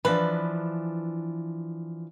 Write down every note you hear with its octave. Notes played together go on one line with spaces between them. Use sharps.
E3 F3 D4 B4